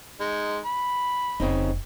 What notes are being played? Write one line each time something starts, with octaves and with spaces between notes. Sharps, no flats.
G#3 D#4
B5
F1 C#3 C4 D#4